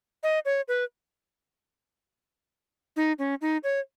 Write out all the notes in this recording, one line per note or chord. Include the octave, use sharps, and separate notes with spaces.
D#5
C#5
B4
D#4
C#4
D#4
C#5